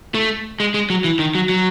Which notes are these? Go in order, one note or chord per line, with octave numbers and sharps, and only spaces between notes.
A3
G#3
G#3
F#3
E3
D#3
F#3
F#3